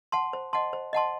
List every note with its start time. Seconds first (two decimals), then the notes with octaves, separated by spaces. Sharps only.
0.12 F#5 A5 C6
0.33 C5
0.53 D#5 F#5 A5 C6
0.73 C5
0.93 D#5 F#5 A5 C6